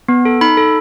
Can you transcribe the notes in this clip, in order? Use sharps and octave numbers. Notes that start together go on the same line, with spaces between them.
B3
A4
D#4 B5
A4